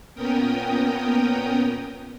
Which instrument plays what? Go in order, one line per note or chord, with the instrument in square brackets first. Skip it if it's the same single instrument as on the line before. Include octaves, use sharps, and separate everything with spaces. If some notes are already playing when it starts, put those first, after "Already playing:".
[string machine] A#2 B3 C#4 A#4 G5 D#6